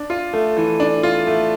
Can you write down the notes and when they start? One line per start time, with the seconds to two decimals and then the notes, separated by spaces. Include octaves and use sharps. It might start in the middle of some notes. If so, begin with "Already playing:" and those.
Already playing: D4
0.10 F4
0.33 A3
0.57 E3
0.80 D4
1.03 F4
1.27 A3